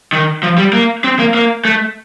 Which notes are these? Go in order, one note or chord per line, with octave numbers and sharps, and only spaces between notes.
D#3
F3
G3
A#3
C4
A#3
A#3
A3